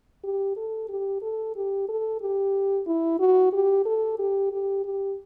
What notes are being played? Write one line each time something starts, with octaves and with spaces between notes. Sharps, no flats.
G4
A4
G4
A4
G4
A4
G4
E4
F#4
G4
A4
G4
G4
G4